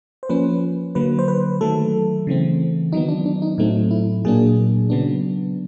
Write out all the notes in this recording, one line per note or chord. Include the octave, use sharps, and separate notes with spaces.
C5
F3 A#3 C#4 B4
D3 F#3 A#3 B4
C5
B4
D#3 F#3 A3 A4
C#3 E3 A3 C4
D#3 F#3 B3 D#4
D4
D4
D#4
A2 F#3 A3 C4 D#4
E4
A#2 F#3 A#3 D4 G#4
C#3 F#3 B3 D4